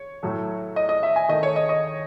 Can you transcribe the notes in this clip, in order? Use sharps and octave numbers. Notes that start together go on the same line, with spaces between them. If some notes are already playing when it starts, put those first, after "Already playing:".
Already playing: C#5
A2 F#3 A3
D#5
D#5
E5
G#5
D#3 A3 D#5
C#5
D#5
D#5